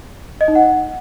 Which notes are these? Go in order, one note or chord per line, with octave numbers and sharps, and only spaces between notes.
D#5
D#4
F#5